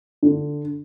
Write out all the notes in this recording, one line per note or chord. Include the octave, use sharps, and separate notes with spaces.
D3